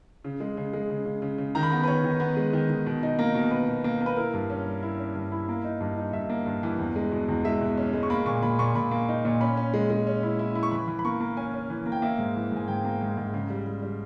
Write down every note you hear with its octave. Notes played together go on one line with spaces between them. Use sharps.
C#3
G#3
C#3
G#3
C#3
C#3
C#3
C#3
D#3 A#5
B5
B3 A#5
B4
D#3 C#5
D#3
B3
G#3
D#3
D#3
B2
D#4
A#3
B2
A#3 B4
B2
A#3
A#3
B4
E4 A#4
G2
C#4
G3
E4
C#4
G2
E4
A#3
D#4
G2
D#4
G2 E5
A#3
G2
E3
E2
G#3
B2
E2
G#3 E5
B2
C#4
G#3
C#6
A#3 B5
A#2 C#6
A#2 B5
A#2 C#6
A#2 B5
A#3
D#4
A#2
C#4 B5
C#4
G#3
G#3
C#4
E4
E4
E4
C#6
E3 B5
E3
B5
A#3 C#6
A#3
C#4 G#5
C#4
E3
A#3
G5
A#3 E5
G#2
E3
G#2 G#5
G#2 G5
A#3
G#2
G#2
C#3
G3
G3
G3